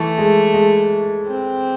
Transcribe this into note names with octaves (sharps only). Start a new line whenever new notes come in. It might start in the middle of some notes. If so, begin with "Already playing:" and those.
Already playing: E3 A3
G#3
G#3
C4